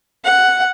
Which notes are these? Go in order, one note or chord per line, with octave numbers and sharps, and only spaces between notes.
F#5